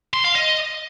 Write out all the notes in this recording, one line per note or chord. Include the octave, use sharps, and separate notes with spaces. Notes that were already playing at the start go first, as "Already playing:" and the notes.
C6
F5
D#5